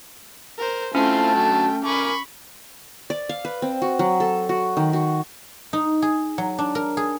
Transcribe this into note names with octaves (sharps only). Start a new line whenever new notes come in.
A#4 C5
A3 C4 C#4 E4 F4 G5 A5
D3 F#3
A#4 G#5 B5 C#6 D6
D5
F5
B4
C4
F#4
F#3
A4
F#4
D#3
F#4
D#4
G#4
F#3
D4
A#4
G#4